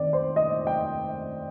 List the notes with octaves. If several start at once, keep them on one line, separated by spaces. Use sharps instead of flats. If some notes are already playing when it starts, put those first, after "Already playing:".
Already playing: D#3 C4 D5
C5
D#5
G5